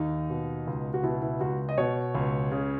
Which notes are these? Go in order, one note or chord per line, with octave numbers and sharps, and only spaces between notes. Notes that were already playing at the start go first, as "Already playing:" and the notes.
Already playing: D#2 D#3 D#4
B2
C#2
F#4
B2 E4
E4
C#2 F#4
D#5
B2 C#5
C#2
C#3